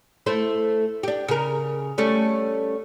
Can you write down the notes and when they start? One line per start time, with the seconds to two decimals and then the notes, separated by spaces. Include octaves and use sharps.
0.26 A3 E4 C5
1.03 D4 G4
1.28 C#3 A#4
1.98 G3 A3 C#4